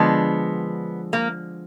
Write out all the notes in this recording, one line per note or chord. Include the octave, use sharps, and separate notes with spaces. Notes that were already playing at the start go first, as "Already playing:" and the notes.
Already playing: D3 F3 G#3 B3
A#3